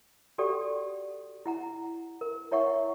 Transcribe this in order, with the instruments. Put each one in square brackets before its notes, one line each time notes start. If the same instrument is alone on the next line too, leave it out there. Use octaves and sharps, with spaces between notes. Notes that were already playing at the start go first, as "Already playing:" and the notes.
[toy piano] F#4 G4 A4 D5 F#5 G5
E4 F#5 A#5
A#4
E4 C#5 E5 F#5 C#6